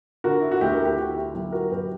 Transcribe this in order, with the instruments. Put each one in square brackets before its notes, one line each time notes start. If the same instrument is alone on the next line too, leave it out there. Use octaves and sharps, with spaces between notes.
[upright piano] D3 F#4 A#4
E4
F#4
D2 E4 G4
A#4
G4
D3 F#4
E4 G4
F#3 E4 G4
F#4 A#4
F#2 G4 B4